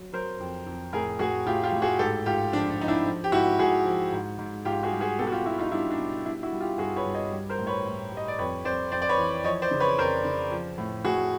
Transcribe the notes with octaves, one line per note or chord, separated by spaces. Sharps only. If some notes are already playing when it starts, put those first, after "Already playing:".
Already playing: F#3
F#3 A#4 C5
F2
F2
A2 G#4 A#4
A2 F#4 G#4
A2 F4 G4
F4 G4
A2
F#4 G#4
G#2 G4 A4
G#2 F4 G4
F3 D4
D4
F3 D#4
D4 E4
F3
G4
G#2 E4 F#4
G#2 F#4 G#4
F3
G#2
G#2
G#2 F4 G4
F#4 G#4
G3
F#4 G#4
B2 G4 A4
F#4
F4 G4
B2 E4 F#4
D#4 F4
G3 D4 E4
D4
B2
G3 D4 E4
E4 F#4
G3
F4 G4
G2 F#4 G#4
B4 C#5
G2
C#5 D#5
G3
A#4 C5
A2
B4 C#5
A2
G3
D#5
D5
F2 B4 C#5
F2 C5 D5
F2 C5 D5
D5
B4 C#5
E3
F3 C#5 D#5
C5 D5
C#3
B4 C#5
F2 A#4 C5
C#3
F3
A2
A2 F#4 G#4